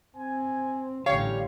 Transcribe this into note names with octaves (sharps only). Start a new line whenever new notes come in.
C4 G#5
A1 D3 G3 C#4 G4 C#5 F5